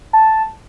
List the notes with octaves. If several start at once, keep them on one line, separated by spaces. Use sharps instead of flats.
A5